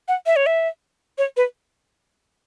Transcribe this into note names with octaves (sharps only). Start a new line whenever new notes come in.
F#5
E5
C#5
E5
C#5
B4